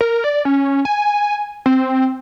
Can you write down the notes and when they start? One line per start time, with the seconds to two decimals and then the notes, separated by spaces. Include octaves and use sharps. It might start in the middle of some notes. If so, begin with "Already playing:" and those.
0.01 A#4
0.24 D5
0.45 C#4
0.85 G#5
1.66 C4